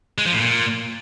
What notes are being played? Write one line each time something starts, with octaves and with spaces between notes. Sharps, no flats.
G#3
F3
A2
A#2